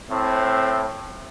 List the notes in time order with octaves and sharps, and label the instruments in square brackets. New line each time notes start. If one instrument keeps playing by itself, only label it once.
[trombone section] A2 [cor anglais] C4